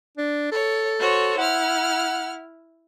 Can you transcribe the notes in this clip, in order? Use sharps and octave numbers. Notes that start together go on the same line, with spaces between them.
D4
A4 C#5
F#4 C5 C#5
E4 F#5 F6